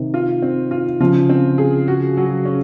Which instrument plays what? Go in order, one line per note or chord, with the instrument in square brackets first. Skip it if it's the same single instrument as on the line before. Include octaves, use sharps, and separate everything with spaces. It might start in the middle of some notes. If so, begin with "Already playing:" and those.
Already playing: [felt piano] C3 D#3
[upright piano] F4
C4
F4
[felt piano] C#3 F3 [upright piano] F4
[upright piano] C4
G#4
F#4
F#3
C#4